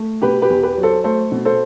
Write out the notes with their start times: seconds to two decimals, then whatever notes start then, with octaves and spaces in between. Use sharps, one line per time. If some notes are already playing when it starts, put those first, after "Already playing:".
Already playing: A3
0.22 B2 G4 B4
0.42 G4 B4
0.50 E2
0.63 G4 B4
0.77 F#3
0.83 A4 C5
1.04 A3 A4 C5
1.32 B2
1.45 A4 C5